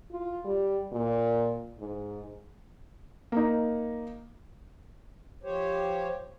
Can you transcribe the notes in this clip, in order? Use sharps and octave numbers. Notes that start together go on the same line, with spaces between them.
F4
G3
A#2
G#2
A#3 D#4
F3 G4 C5 C#5